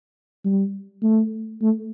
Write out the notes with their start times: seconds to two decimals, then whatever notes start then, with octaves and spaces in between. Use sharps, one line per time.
0.45 G3
1.03 A3
1.62 A3